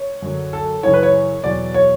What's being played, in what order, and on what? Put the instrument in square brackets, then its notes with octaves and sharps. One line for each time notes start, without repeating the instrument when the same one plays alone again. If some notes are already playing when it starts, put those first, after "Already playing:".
Already playing: [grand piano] C#5
F#2 D3 F#3
A4
F#2 C#3 E3 C#5
B4
C#5
E2 B2 F#3 D5
C#5